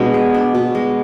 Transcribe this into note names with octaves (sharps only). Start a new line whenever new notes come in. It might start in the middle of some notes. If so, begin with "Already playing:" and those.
Already playing: B2 G#3 D4
G#4
D4
B2
G#3